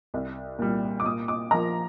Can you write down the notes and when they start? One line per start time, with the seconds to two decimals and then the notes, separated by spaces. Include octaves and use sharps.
0.14 C2
0.59 A#2 G3
1.00 D6
1.05 A#2 D#6
1.28 D6
1.51 F3 A#3 A#5